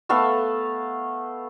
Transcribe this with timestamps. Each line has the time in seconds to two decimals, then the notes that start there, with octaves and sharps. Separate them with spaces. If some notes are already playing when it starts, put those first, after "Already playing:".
0.09 A3 B3 A4 F5